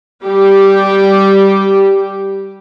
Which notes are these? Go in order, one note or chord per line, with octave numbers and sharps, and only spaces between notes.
G3 G4